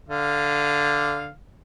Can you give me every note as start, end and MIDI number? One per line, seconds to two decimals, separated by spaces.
0.09 1.31 50
0.09 1.31 77